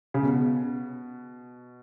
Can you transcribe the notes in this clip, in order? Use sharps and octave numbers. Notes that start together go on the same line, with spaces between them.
C#3
B2